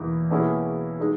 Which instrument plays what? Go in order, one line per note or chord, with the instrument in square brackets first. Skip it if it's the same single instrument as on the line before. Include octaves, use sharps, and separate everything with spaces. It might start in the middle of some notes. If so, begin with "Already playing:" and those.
Already playing: [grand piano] E2 B2 A#3 E4
B2 A#3 C#4 E4 G#4
G#3 D#4 G#4